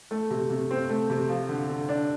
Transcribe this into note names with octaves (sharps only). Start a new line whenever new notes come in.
A3
C3
C3
C4
A3
C3
F3
D3
D3
D4